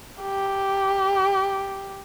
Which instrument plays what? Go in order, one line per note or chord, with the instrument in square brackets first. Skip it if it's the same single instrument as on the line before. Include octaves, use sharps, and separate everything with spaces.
[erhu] G4